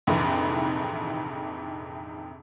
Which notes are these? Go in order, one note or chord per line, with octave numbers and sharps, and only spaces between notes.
A#1 F2 G#2 C3 D#3 E3